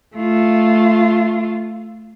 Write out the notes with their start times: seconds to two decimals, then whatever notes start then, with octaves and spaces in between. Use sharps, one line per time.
0.16 A3 F4